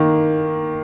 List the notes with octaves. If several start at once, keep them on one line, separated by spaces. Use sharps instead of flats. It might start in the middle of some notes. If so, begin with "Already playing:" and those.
Already playing: D#3 A#3